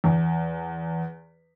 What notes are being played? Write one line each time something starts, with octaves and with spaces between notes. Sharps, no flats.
E2